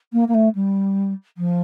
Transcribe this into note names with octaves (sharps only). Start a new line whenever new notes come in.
A#3
A#3
A3
G3
F3